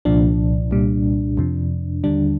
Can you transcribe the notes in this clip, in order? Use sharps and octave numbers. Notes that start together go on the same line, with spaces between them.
C2 A#2 F3 D4
C2 A#2 G3
F2 C3 F3
D#2 D3 G3 D4